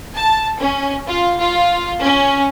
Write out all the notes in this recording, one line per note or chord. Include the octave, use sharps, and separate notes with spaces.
A5
C#4
F4
F4
C#4